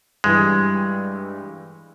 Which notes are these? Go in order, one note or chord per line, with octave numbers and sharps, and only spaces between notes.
G2 E3 G3 G#3